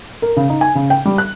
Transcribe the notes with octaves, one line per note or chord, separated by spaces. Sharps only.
A#4
C#3
D#4
G#5
C#3
G5
G3
F#6